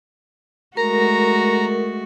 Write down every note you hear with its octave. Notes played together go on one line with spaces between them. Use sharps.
G#3 A3 F#4 A#4 A#5